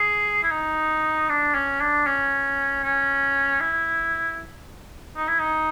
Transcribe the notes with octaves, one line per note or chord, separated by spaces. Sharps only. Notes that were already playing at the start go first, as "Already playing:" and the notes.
Already playing: G#4
E4
D#4
D4
C#4
D4
C#4
C#4
E4
D#4
E4
D#4